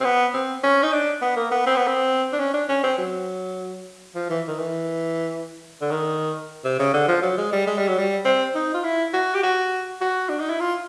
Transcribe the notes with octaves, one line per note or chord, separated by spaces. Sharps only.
C4
B3
C4
C#4
D#4
D4
B3
A#3
B3
C4
B3
C4
D4
C#4
D4
C#4
C4
F#3
F3
E3
D#3
E3
D3
D#3
C3
C#3
D3
F3
F#3
G#3
G3
G#3
G3
F#3
G3
C4
D#4
F4
E4
F#4
G4
F#4
F#4
D4
D#4
E4
F4